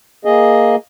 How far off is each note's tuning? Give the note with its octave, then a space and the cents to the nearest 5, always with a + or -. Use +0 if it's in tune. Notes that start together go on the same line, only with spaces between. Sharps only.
A#3 +0 G#4 +0 D#5 +0